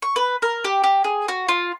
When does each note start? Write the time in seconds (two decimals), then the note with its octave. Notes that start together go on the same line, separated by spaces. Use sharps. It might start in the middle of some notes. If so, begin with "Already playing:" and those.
0.02 C#6
0.16 B4
0.42 A#4
0.65 G4
0.84 G4
1.04 G#4
1.28 F#4
1.48 F4